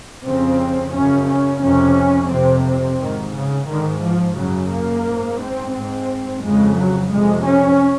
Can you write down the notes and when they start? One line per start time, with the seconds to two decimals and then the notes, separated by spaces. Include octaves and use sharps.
0.24 F2 C#3 C4
0.93 F#2 C#3 C#4
1.27 C#4
1.62 F2 C3 C#4
2.30 F2 C3 C4
2.65 C4
2.99 G#2 D#3
3.34 C#3
3.68 G#2 D#3
4.02 F3
4.36 F#2 C#3 F#3
4.71 A#3
5.05 G#2
5.40 C4
5.73 G#2 C4
6.42 F2 C#3 G#3
6.77 F#3
7.11 F2 C3 G#3
7.46 C#4